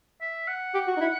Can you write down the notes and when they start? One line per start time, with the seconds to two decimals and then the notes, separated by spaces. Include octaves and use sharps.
0.21 E5
0.48 F#5
0.74 G4
0.87 F#4
0.97 D#4
1.00 E4